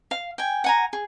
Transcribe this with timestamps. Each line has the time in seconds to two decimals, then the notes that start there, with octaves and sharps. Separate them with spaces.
0.11 F5
0.38 G5 G#5
0.64 F#5 G#5 A#5
0.93 G#4